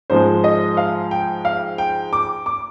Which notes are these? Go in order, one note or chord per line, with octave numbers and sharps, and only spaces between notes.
G#2 F3 G#3 C5
D#5
F5
G5
F5
G5
D6
D6